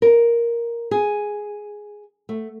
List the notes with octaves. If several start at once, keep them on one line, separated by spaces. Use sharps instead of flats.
A#4
G#4
A3